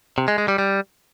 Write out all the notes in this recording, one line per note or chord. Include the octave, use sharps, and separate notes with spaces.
C3
G#3
G#3
G3
G3